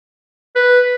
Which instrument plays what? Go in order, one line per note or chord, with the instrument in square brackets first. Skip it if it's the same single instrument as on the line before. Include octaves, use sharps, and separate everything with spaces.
[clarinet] B4